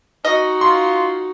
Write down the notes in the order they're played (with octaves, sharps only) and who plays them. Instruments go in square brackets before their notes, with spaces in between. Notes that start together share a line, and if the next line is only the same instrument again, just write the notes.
[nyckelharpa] D#4 F#4 [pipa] D#5
[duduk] F4 [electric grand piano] C6